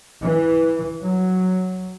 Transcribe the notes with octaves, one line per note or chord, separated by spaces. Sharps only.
E3
F#3